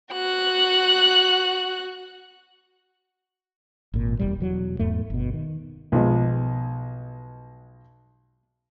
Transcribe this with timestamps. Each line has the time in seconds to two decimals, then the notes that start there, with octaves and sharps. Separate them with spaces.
0.12 F#4 F#6
3.94 G#1 A#2
4.19 E1 A1 G3
4.40 E1 E2 F#3
4.79 E2 G#2 A3
5.10 G1 B2
5.34 D#3
5.92 B1 F3 G#3